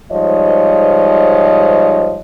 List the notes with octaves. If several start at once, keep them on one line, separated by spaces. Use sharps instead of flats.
G#2 F3 G3 C#5 D#5